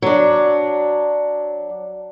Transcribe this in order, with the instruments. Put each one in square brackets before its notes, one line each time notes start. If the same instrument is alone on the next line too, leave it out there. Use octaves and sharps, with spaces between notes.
[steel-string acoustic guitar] F#3 D4